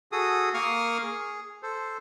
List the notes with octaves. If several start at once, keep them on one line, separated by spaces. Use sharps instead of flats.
F#4 G#4 A4 D#6
A#3 A#4 F5 C#6 D#6 F6
G#4
A4 C5